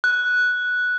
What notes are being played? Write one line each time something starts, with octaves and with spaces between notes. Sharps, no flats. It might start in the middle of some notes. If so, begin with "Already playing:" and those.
F#6